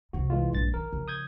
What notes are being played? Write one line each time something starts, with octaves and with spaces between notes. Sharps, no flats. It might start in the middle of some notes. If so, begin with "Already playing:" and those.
C2 F2 F#4
E3 G#3 F4
A#1 G2 A6
D#3 A#4
C#3 F3
D#6 G6 G#6